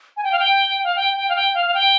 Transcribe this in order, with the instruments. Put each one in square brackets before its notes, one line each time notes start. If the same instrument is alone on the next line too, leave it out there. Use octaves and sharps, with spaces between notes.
[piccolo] G#5
G5
F5
G5
F5
G5
G5
F5
G5
F5
F5
G5